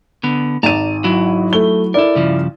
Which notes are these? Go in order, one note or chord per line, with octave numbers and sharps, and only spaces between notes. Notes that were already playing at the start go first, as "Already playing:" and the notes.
D3 B3
G#1 D5 A5 A#5 D#7
F#3 E4 F#4
A3 G7
E4 A4 A#4 D5
G2 C#3 F3